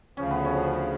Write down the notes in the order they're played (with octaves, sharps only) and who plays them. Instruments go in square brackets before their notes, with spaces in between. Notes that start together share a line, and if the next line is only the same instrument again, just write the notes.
[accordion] D2 C#3 F3 [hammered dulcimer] C#4
[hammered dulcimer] B3
C#4